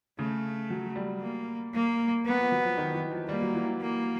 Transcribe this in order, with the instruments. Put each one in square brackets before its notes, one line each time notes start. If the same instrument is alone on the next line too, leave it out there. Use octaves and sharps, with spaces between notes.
[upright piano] C#3 [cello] A3
[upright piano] F#3
G3
[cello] A#3
A#3
B3
[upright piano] F3
F#3
F3
D#3
E3
F3
[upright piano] G3 [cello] A#3
[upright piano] F#3
E3
[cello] A#3